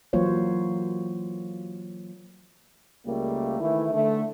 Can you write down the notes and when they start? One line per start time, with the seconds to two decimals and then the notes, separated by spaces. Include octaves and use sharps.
0.13 E3 F#3 A#3 F4 C5 C#5
3.06 C#2 G3 A3 A#3
3.60 D#3 E3 A3 E4
3.94 D3 A3